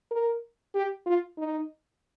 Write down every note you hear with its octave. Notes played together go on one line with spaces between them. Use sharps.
A#4
G4
F4
D#4